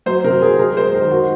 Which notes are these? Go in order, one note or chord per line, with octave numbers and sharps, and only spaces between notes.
F#3 C5
C3 A#4
F#3 G#4
G#3 A#4
G#3 C5
D#3 A#4
F#4